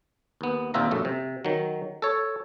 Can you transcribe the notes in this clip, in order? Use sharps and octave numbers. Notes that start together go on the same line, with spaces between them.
D#2 B3
D#2 A#2 C4 F4 E5 A#5
A#1 F#2 A3
C3
D#3 F#3
A4 C#5